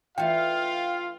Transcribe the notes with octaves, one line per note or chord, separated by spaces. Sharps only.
E3 A3 D4 F4 F5 G5